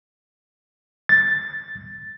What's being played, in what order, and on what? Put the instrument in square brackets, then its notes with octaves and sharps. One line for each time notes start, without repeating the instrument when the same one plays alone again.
[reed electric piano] A6